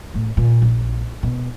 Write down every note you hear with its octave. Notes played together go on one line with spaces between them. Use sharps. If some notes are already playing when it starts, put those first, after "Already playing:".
A2
A#2
A#1
B2